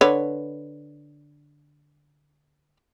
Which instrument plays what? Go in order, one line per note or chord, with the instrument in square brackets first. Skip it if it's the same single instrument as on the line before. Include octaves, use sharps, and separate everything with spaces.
[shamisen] D3 B4 C#5